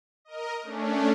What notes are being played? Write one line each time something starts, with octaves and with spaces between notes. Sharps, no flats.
A#4 D#5
A3 C#4 D4